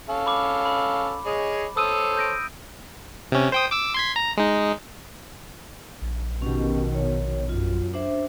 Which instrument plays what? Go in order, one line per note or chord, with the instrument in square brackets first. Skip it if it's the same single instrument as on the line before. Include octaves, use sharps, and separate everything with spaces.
[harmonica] C#4 A4 F5
[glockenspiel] B5 D6
B5
[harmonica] G#4 C#5 D#5
[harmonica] A4 C5 C#5 [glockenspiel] D#6 E6 D#7
[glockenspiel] G6 A#6 D7
[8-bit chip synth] C3 C#4
C5 G5 D#6
D6 E6
C6 G#6 B6
A#5
G#3 D#4
[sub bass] A#1
[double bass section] B2 D#3 [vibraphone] C#4 G4
[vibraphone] C#5
[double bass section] F#2 [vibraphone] F4
[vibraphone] D4 C5 E5